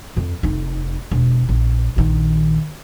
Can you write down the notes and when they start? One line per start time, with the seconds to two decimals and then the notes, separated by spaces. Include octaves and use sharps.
0.17 F2
0.43 F1 D#4
1.11 E1
1.49 A#1
1.96 A#1 D#3